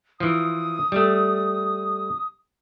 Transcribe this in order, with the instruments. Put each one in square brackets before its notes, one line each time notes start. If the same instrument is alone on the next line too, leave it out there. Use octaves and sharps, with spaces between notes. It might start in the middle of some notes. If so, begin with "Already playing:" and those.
[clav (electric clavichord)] E3 F3 [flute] D#6
[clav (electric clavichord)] G3 A3